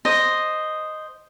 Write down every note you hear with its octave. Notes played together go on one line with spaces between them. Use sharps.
C5 D#5